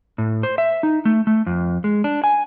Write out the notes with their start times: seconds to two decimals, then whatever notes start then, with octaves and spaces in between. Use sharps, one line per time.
0.18 A2
0.43 C5
0.58 E5
0.83 D#4
1.05 A3
1.27 A3
1.46 F2
1.84 G#3
2.04 D4
2.24 G#5